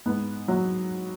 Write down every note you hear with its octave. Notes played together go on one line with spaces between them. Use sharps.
G#2 B3
F#3